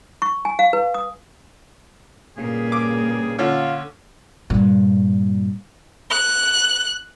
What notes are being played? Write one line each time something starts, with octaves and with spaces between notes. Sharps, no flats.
C#6
G#5
F5
B4
D#6
G2 A#2 C#3 A#3 G#4
D6
D3 C#4 F4
G2 A#2
F#6